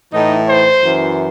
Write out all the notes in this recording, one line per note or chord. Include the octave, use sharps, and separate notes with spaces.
A2 E3 D#4
C5
F#2 E3